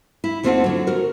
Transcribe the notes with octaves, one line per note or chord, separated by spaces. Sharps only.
E4
D#2 A3 C4 F4 C5 F#5
D3 F#3
F#4 A#4